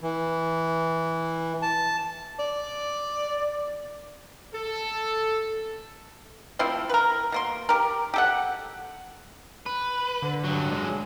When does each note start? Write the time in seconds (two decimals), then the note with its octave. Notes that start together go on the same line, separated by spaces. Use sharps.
0.01 E3
1.62 A5
2.39 D5
4.54 A4
6.59 F3 A3 C4 E4
6.89 A#4 B4
7.32 B2 A#3 C6
7.69 G4 A#4
8.14 G4 A4 F#5
9.66 B4
10.22 D3
10.44 G2 F#3
10.72 G#3